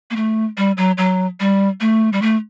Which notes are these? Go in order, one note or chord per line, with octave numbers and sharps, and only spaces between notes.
A#3
A3
G3
F#3
F#3
G3
A3
G3
A3